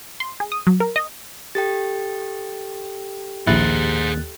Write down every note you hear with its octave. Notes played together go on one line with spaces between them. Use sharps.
C6
G#4
D#6
F#3
A#4
D#5
G4 A4 G5 A6
A#1 D#2 E4 G#4 C5 F#6 A6